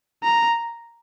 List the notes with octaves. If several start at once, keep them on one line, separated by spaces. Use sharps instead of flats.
A#5